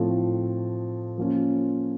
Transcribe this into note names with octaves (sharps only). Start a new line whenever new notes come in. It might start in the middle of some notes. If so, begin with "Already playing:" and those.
Already playing: A2 F3 A3 C4
F3 A#3 C#4 F4